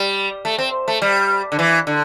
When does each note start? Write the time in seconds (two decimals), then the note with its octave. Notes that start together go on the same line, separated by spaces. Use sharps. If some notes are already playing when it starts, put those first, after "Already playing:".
Already playing: G3
0.45 A3
0.58 C4
0.88 A3
1.02 G3
1.52 D3
1.59 E3
1.87 D3